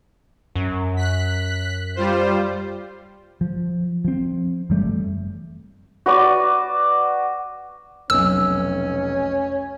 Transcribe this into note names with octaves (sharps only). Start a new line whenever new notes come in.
F#2
F#6 B6
G3 F4 C5
F3
F3 C4
F#1 E3 G3 A3
F#4 B4 D5
F1 B1 C#4 E6